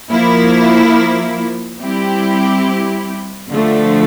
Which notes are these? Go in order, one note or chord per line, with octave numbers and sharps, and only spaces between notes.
F3 A#3 E4
G3 C4 E4 G4
D3 F3 A3